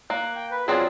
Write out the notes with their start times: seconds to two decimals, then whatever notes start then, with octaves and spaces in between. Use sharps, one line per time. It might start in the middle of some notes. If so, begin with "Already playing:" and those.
0.10 A#3 F#6
0.35 G5
0.51 B4
0.68 F#3 C4 D4 F4 G#4